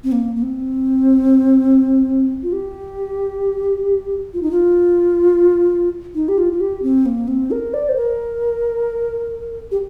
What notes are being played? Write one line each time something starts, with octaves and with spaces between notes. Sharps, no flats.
C4
A#3
A#3
C4
F4
G4
F4
D#4
F4
D#4
G4
F4
F4
G4
C4
A#3
C4
A#4
D5
C5
A#4
G4